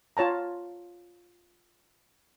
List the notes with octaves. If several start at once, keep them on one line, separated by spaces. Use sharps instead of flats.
F4 C#5 A5 A#5